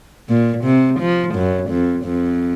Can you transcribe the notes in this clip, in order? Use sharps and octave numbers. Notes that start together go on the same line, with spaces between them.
A#2
C3
F3
F#2
F2
F2